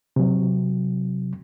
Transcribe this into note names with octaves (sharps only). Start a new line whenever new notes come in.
C3 F#3